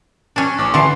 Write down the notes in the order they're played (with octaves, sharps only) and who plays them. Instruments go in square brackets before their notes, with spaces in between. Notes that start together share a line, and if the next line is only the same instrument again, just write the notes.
[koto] C#4 D4
[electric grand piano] A1 D6
[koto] D3 E3 [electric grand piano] C6 C7